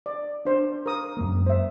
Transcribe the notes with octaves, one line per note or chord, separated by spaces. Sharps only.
D5
D4 C5
A#4 D#6
F#2 G#3 A#3
C5 E5